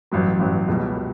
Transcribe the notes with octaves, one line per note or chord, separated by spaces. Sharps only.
A1 G2 F#3
A1 G2 F#3
C#2 B2 G3
B2